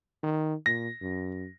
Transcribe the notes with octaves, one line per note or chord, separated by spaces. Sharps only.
D#3
A#2 A#6
F#2